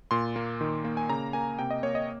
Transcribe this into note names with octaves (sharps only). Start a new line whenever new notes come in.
A#2 C6
A#3
D#3
A#3
G#5
C#3 A#5
A#3 G#5
C3 G5
D#5
A#3 C#5
D#5